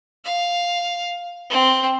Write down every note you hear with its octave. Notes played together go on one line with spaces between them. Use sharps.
F5
C4